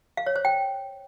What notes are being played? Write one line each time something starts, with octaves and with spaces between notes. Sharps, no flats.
F5
C#5
C5
G5